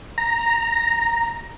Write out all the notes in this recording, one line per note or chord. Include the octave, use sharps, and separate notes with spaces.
A#5